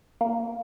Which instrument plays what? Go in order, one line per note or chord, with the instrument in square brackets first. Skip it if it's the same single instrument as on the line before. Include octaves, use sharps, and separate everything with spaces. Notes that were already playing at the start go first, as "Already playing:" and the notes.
[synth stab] A#3